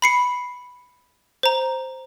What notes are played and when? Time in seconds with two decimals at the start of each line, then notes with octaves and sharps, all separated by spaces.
0.02 B5 C7 C#7
1.43 C5 A#5